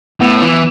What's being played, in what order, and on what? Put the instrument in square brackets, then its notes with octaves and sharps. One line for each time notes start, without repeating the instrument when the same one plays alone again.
[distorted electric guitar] A2 [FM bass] B3
[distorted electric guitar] E3